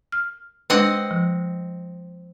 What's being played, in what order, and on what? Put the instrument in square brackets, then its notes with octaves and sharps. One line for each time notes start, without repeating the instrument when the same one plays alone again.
[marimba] F6
[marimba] G#3 D4 B4 [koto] C4 D#5 F#5
[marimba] F3